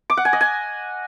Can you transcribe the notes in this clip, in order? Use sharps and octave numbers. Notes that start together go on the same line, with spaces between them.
D6
F#5
G#5
D#5
G#5